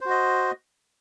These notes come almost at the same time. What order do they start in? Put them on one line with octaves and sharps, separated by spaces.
C5 F#4 D#5